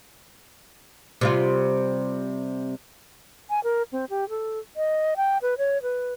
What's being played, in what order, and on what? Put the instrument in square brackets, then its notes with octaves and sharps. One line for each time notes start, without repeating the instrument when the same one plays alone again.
[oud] C3 G3 F4
[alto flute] G#5
A#4
C4
G4
A4
D#5
G5
B4
C#5
B4